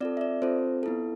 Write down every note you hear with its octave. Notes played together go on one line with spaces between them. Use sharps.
C4 F4 A4 D5
E5
D5
C4 F4 A4 C5
B3 E4 A4